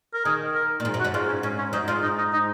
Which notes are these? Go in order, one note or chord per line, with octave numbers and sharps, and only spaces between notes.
A#4
D#3 G#4
A#4
A#2
G#2
F#2
F#4
F#2
G#2 F4
C#4
G#2 C#4
C#4
F#2 D#4
G#2 F4
D#4
D#4
D#4